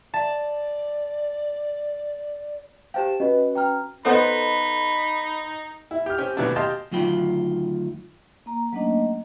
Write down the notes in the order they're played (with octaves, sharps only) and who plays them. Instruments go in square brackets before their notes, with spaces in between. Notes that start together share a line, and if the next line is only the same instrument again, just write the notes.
[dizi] D5 [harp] A5
[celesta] G4 C5 F5 [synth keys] G5 A5 E7
[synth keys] C#4 F#4 B4 [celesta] D#5
[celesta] G5 A#5 F6
[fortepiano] B3 C5 F#5 [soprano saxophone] D#4 [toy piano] A4 D#5 [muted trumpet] B5
[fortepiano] E4
G4 F6
C4 C#4 G4
D#2 A2 F#3 B3 D4
G4 D#5 F5 A5 C6
[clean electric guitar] D2 D#3 F#3 F4 G5 B5
[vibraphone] A#3 A#5
F#3 A3 A#3 C#4 D4 D#5